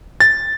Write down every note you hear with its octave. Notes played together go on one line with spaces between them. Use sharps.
A6